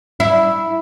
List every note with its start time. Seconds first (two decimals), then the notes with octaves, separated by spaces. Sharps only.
0.20 E4